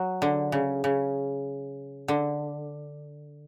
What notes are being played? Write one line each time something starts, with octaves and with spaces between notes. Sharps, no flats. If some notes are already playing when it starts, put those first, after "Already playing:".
Already playing: F#3
D3
C#3
C#3
D3